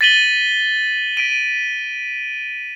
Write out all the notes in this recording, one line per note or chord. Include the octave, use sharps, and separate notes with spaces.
A6 B6 D#7 F#7 G7
B6 D7 D#7